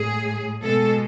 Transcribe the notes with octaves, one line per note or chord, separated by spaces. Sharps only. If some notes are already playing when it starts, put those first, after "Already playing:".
Already playing: A2 G#3 G#4
B2 G#3 A4